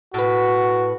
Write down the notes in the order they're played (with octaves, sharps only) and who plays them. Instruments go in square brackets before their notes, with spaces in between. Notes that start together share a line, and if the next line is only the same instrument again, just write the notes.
[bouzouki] A2 B4 [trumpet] F#4